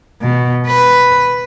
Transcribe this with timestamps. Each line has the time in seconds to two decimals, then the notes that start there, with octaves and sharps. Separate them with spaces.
0.22 B2
0.67 B4